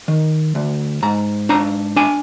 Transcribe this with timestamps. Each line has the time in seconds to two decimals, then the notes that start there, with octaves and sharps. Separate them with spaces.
0.08 D#3
0.55 D2
1.03 G#2 A#5
1.49 D4 A#5
1.96 D4 G#5